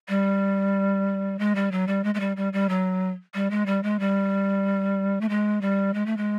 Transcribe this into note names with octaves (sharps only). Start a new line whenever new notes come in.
G3
G#3
G3
F#3
G3
G#3
G#3
G3
G3
G3
F#3
G3
G#3
G3
G#3
G3
A3
G#3
G3
G#3
A3
G#3